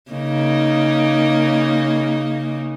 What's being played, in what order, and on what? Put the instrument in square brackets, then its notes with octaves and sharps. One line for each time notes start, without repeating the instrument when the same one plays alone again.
[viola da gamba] C#3 A#3 D#4